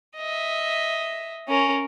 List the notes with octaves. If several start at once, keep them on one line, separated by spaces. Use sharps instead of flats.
D#5 E5
C#4 A#4